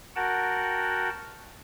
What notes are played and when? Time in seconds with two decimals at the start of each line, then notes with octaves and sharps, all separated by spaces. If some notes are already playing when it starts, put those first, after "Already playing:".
0.16 F#4 A#4 F#5 G5 A5